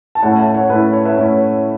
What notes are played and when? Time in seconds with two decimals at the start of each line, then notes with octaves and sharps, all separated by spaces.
0.15 A5
0.22 A2 A3 C#4 E4 C#5 F#5
0.39 E5 A5
0.54 C#5 F#5
0.70 A2 A3 C#4 E4 B4
0.93 C#5
1.05 B4 E5
1.17 A2 A3 C#4 E4